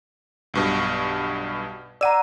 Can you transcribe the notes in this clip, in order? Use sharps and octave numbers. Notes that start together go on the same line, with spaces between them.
B1 G2 B2
D5 F#5 A#5 E6 D#7